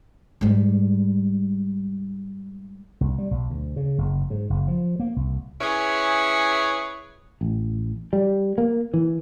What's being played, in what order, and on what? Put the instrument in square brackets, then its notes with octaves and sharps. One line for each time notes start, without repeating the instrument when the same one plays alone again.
[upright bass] G#2 G3
[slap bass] C2
G3
B1
D2
C#3
F#1
G#2
F#1
F3
A#3
C2
[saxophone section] C#4 E4 G#4 B4 C#5
[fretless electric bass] A1
G3
A#3
E3